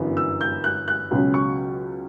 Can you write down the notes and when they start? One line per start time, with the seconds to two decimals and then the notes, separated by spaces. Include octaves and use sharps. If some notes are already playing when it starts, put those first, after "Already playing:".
Already playing: G1 F#2 E3 B3 D4
0.17 E6
0.41 G6
0.64 F#6
0.88 F#6
1.11 C#2 B2 F#3 C#4
1.34 C#6